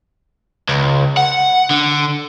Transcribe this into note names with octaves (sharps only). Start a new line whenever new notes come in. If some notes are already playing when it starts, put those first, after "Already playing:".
C#2
F#5
D3